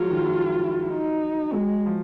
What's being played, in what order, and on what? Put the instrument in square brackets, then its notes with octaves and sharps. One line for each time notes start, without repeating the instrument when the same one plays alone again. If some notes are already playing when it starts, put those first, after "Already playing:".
Already playing: [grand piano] F3 F#3 G#3 [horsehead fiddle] F4
[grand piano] D#3
F#3
[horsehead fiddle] D#4
[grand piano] F#3 [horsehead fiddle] G#3
[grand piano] F3